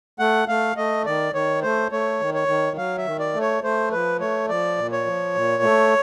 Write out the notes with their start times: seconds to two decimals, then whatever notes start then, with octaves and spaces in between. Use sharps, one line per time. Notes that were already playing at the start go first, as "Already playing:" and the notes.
0.19 A3 F#5
0.48 A3 F5
0.76 A3 D#5
1.06 D#3 D5
1.34 D#3 C#5
1.62 A3 C5
1.92 A3 C#5
2.20 D#3
2.34 C#5
2.48 D#3
2.77 F#3 F5
2.98 E5
3.06 D#3
3.19 D5
3.34 A3
3.41 C#5
3.63 A3 C5
3.91 F3 B4
4.19 A3 C#5
4.49 F3 D5
4.77 A#2
4.92 C#5
5.06 F3
5.35 A#2
5.63 A3